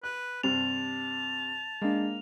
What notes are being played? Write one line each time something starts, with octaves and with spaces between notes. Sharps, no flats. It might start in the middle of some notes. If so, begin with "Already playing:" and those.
B4 F#6
G2 C3 C4 A5 F7
G#3 A#3 D4